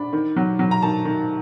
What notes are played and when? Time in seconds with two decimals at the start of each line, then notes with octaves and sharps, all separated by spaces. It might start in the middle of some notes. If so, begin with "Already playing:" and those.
Already playing: D4 B5
0.13 D#3
0.36 F#3
0.59 F#3
0.71 A#5
0.82 D#3 A5
1.05 D#3